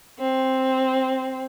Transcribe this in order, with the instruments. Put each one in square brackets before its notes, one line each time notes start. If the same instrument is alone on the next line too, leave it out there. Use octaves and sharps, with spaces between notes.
[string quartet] C4